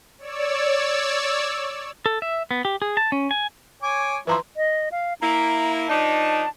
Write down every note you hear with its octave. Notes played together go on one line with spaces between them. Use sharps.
C#5 D5 E6
A4
E5
B3
G4
G#4
A5
C#4
G#5
C#5 G#5 D6
E3 F3 E4 B4 A#5 C6
D#5
F5
A#3 E4 A#5
F3 D4 D#4 A5